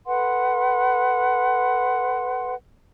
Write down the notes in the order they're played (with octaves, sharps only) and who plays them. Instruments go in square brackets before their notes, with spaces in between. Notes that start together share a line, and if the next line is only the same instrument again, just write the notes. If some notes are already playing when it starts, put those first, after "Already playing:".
[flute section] A4 B4 F#5 C6